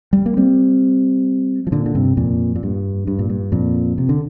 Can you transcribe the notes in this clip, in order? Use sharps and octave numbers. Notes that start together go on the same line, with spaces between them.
G3
A#3
G3 C4
F3
A#2 D3
D3
G2 C3
F2 A#2
A#2
G2
G2
A#2
G2
F2 A#2
C3
D3